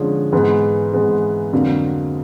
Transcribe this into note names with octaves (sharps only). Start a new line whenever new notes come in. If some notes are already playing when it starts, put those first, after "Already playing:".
Already playing: D3 F3 G#3 C#4
G#2 E3 G#3 B3
G#2 E3 G#3 B3
F2 D3 F#3 A#3